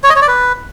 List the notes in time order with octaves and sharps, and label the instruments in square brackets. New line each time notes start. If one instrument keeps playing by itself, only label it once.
[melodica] C#5
D#5
C#5
D5
B4